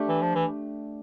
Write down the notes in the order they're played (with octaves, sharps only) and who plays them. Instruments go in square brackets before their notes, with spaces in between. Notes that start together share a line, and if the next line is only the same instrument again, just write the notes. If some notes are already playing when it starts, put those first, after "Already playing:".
Already playing: [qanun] A3 D4 G4
[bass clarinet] E3
F3
E3